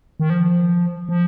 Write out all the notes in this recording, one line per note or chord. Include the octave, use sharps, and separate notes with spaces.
D#3
F3
F3